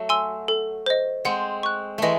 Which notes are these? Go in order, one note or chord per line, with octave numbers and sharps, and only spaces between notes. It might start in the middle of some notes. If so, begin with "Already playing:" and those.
Already playing: F#3 A3
G#5 C6 E6
A4
C5 D#5
G#3 C4 F#5
C#6 F#6
E3 G#3 A3 D#5